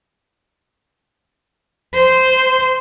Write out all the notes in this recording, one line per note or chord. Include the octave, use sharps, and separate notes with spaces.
C5